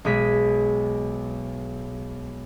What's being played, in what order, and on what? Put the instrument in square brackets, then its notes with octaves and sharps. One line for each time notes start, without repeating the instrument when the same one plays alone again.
[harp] B1 G#3 G#4 B6